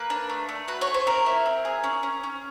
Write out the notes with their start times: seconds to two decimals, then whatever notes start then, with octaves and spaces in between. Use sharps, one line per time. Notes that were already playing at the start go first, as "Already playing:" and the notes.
Already playing: A#3 B4
0.10 D4
0.30 A3
0.49 A3
0.68 F#4 B4
0.81 C#5
0.87 A3
0.94 C5
1.07 C4 A#4
1.26 E4
1.46 C4
1.65 G#4
1.84 C#4
2.03 C#4
2.23 C#4